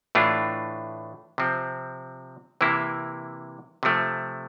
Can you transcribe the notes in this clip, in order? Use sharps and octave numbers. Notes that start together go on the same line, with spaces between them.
A2 E3 A3 D4 F4
C3 F3 C4
C3 E3 A#3 E4
C3 F3 A3